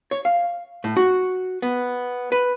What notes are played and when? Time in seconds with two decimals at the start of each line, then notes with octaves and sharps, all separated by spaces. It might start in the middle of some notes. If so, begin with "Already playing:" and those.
0.11 C#5
0.25 F5
0.84 A2
0.97 F#4
1.62 B3
2.32 B4